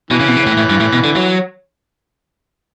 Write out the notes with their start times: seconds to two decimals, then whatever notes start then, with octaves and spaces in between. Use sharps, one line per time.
0.11 B2 E3
0.20 C#3
0.28 B2
0.37 C#3
0.46 A2
0.57 A2
0.70 G2
0.80 A2
0.93 B2
1.04 D3
1.16 F#3